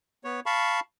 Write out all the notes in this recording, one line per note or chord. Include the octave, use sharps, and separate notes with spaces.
B3 C#5
F5 A5 B5 C#6